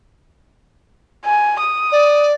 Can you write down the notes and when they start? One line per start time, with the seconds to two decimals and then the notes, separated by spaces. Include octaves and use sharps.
1.26 G#5
1.60 D#6
1.92 D5